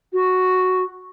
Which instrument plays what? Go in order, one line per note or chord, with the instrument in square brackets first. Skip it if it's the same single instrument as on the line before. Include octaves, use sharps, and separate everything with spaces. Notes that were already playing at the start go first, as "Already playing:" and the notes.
[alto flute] F#4